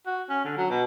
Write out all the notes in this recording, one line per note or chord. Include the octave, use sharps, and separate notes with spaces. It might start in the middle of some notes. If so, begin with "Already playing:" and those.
F#4
C#4
D3
F#3
B2